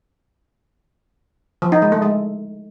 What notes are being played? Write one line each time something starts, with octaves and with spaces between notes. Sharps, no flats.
F3
D#4
G#3
A3
G#3